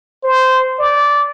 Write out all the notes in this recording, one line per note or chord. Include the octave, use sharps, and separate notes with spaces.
C5
D5